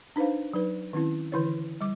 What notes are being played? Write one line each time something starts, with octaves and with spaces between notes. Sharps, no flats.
D4 D#4 B4 C5 F5
F#3 D#4 B4
D#3 C4 C#4 E4
D3 E3 E4 B4 C#5
G3 D6